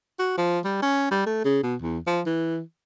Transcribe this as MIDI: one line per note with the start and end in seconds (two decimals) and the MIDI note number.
0.19 0.35 66
0.38 0.59 53
0.65 0.82 55
0.82 1.08 61
1.11 1.25 55
1.26 1.42 57
1.45 1.61 49
1.63 1.75 47
1.82 1.99 40
2.07 2.21 53
2.26 2.61 52